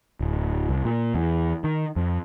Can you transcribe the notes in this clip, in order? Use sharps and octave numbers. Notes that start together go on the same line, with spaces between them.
D1
C2
A#2
E2
D#3
F2